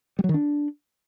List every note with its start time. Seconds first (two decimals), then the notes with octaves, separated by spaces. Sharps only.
0.19 G3
0.24 F#3
0.29 D#3
0.34 D4